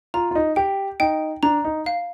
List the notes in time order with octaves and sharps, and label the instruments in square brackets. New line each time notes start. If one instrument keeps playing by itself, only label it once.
[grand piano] F4 [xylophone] A#5
[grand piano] F4
D#4
[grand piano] G4 [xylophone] G5
[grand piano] D#4 [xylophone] G5
[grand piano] D4 [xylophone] A#5
[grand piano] D#4
[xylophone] F5